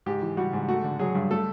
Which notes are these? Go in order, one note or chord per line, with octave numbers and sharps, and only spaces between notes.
G#2 G4
E3
G3 F#4
G#2
A3 F#4
D3
F#3 G#4
G2
A3 A4